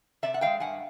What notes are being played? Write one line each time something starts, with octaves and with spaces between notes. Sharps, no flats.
C3 D5 E5
F#5
E3 G#3 F5 G5
G2 F#5 G#5